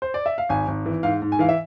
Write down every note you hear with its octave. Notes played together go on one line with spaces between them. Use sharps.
C5
D5
E5
F5
G#1 G#5
G#1
E3
G#2 F5
G#2
G#5
E3 F5
E5